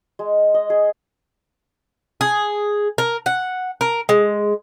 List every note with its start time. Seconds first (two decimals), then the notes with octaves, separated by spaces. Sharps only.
0.19 G#3
0.54 D#5
0.70 G#4
2.21 G#4
2.98 A#4
3.26 F#5
3.81 A#4
4.09 G#3